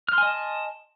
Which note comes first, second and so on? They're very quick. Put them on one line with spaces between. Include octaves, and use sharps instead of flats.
F6 C6 G#5 D#5 A5